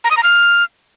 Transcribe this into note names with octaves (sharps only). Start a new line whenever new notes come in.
A#5
D#6
A#5
F6